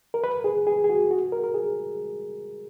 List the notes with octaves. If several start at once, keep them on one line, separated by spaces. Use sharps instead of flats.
A#4
B4
G#4
G#4
G#4
F#4
F#4
A#4
A#4
G#4